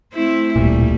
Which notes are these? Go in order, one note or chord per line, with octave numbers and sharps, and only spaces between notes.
A3 C4 E4
D1 B1 A#2 G3 A3